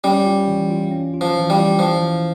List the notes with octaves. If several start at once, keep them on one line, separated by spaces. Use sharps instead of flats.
G3 C#4
F4
E3
F4
C#4
F4
F3
E3
G3
F4
E3 F3
E3